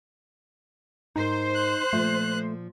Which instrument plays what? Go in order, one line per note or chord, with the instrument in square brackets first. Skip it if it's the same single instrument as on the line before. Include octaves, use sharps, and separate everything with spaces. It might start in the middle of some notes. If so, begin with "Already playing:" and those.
[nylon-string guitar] G#2 A#4 [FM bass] D#4 [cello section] C5
[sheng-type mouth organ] F#6
[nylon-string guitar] A#2 F3 [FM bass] A3